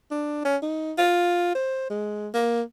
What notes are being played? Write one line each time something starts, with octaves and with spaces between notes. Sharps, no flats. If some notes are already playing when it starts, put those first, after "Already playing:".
D4
C#4
D#4
F4
C5
G#3
A#3